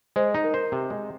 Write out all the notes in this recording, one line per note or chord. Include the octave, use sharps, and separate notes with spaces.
G#3 C5
D#4
A#4
C5
C3
G#3